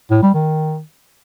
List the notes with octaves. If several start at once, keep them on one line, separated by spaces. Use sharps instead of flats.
A2
G3
D#3